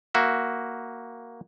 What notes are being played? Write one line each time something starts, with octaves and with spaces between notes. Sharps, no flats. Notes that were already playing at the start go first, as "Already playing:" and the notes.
A#3 F#4 E5